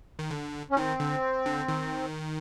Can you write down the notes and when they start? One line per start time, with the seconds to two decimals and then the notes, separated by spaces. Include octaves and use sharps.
0.19 D#3
0.31 D3
0.70 C#4
0.77 D#3 C4
1.00 D3
1.46 D3
1.68 D#3